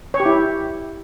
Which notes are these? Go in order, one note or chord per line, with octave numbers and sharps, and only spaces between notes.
C#5
G4
E4